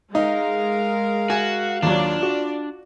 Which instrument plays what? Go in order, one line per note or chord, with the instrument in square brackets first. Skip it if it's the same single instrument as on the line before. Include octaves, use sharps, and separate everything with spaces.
[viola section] G#3 A#4 [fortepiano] D#4 [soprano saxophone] F5
[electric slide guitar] F#4 [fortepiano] G#5
[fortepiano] D#2 F#3 [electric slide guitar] D4 [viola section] F4 D5
[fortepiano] F#4